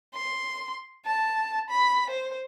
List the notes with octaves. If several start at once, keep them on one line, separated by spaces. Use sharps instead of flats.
C6
A5
B5
C5